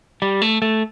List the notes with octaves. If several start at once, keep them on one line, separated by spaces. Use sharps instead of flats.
G3
A3
A3